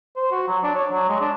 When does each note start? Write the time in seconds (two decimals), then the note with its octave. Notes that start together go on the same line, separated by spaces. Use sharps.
0.17 C5
0.32 F#4
0.48 F#3
0.64 D4
0.75 C#5
0.92 F#3
1.09 G#3
1.21 D4